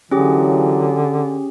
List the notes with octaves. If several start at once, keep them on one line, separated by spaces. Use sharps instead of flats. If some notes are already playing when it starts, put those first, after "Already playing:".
D3 E3 F#3 C#4 G4 G#4